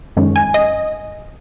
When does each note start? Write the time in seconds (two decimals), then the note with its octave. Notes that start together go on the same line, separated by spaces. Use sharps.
0.17 F#2 D#3 G#3 C#4
0.36 G#5
0.54 D#5